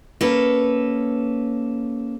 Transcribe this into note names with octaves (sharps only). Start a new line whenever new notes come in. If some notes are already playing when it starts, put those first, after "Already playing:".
A#3 C#4 A4 B4